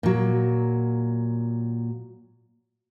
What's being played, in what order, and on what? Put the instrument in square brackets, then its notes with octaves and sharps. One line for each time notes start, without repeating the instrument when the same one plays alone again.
[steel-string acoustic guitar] A#2 F#3